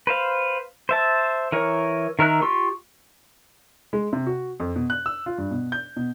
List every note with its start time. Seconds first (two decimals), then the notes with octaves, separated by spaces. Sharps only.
0.07 B4 C5 F5
0.89 C5 E5 A5
1.52 E3 A#4 C#5
2.19 D#3 A#4 E5 F#6
2.42 F4 G4 C6 C#6
3.93 G#3
4.13 C3
4.27 F#4
4.60 F2
4.76 B2
4.90 F#6
5.06 E6
5.26 F4
5.38 G2
5.51 B2
5.72 G6
5.96 B2